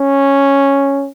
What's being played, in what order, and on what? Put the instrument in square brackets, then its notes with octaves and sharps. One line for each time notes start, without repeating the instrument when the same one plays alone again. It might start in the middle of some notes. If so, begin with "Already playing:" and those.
Already playing: [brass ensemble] C#4